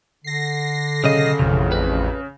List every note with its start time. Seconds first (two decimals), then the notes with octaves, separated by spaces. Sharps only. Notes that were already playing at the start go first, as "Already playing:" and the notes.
0.24 D3 A#6 C7
1.04 B1 C#3 D#5
1.39 A1 F2 C3
1.72 B4